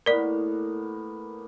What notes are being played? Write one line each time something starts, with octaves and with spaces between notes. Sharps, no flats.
A2 A#3 B3 A#4 D5